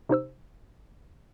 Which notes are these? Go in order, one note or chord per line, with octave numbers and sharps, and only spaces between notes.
C3 D#4 C5 E6